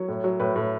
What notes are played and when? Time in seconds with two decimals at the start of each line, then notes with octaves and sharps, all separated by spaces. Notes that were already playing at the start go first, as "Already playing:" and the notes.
Already playing: F#3 C#5
0.08 A2
0.24 F#3
0.40 A2 B4
0.56 A2